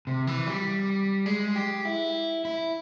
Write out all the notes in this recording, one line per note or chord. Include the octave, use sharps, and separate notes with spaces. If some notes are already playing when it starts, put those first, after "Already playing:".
C3
E3
G3
G#3
G4
E4
E4